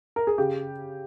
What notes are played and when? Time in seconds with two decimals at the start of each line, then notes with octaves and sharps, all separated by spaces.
0.16 A#4
0.27 G#4
0.38 C#3 G4